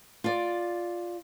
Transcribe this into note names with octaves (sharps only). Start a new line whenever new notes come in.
F4 D5